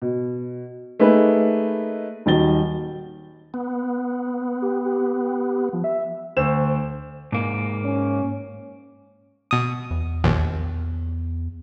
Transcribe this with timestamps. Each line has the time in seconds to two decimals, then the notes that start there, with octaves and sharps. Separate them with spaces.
0.02 B2
1.00 A3 A#3 D#4 G#4 B4
2.26 D#1 D#3 F#3 A6 G7
3.54 B3
4.62 G4
4.85 G4
5.73 F3
5.84 E5
6.37 D2 C5 E6 E7
7.32 G#2 A#3
7.84 C#4
9.51 B2 D#6
9.91 E2
10.24 A#1 D#2